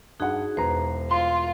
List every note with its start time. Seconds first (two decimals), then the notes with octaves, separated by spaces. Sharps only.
0.20 G2 D#4 F#4 G#4 F#5
0.57 E1 B4 C5 A#5
1.11 F4 C6